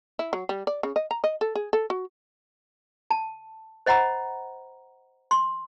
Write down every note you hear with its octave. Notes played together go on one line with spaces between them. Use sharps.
E4
F#3
G3
D5
C#3
D#5
A#5
D#5
A4
G#4
A4
F#4
A5
C5 D#5 F#5 A#5 B5
C6